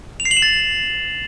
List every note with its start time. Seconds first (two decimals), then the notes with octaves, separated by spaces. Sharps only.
0.20 F7
0.25 C7
0.31 F#7
0.37 E7
0.42 A6